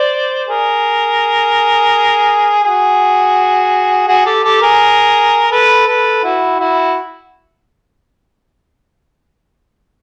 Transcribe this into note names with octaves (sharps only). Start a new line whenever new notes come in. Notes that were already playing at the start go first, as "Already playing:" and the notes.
Already playing: C5 D5
G#4 A#4
F#4 G#4
F#4 G#4
G4 A4
G4 A4
G#4 A#4
A4 B4
A4 B4
E4 F#4
E4 F#4